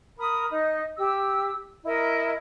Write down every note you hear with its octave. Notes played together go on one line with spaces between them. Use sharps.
A#4 B5 D#6
D#4 D#5
G4 E6
E4 A#4 D#5